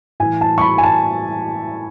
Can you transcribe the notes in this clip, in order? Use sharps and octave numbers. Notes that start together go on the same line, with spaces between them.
A2 E3 G#5
A5
C#6
B5
G#5
A5